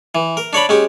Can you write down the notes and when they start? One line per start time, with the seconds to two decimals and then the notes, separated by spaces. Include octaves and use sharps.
0.15 E3
0.37 A#4
0.53 D4 C#5 D5 B5
0.69 G#3 C#4 G4